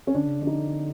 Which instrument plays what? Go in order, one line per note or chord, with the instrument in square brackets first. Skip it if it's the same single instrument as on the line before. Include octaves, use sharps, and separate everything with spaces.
[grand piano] C#4
[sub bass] D3 [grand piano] D4
[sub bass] C#3
[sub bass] D3 [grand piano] D4
[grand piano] D#4